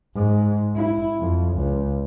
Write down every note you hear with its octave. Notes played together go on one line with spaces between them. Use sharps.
G#2
E4
F2
C#2